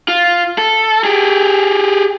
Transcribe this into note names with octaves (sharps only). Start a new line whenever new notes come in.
F4
A4
G4 G#4